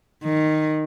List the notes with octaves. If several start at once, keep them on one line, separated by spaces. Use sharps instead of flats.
D#3